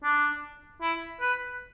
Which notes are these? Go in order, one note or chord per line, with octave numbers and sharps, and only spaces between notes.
D4
E4
B4